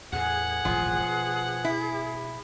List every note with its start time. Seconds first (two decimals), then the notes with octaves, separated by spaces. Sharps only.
0.13 E2 A2 G#4 F#5
0.65 D#1 A1 G#2 F3
1.01 B2
1.65 E4